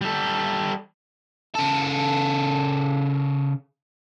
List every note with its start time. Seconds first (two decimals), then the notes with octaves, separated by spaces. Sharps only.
0.01 G3 A4
1.55 C#3 A4